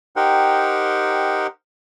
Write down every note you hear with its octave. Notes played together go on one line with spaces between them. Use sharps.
D#4 G4 A#4 C5 F#5 G5